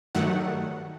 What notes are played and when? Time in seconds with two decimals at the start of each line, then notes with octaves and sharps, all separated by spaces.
0.15 G2 D#3 F#3 A3 F#5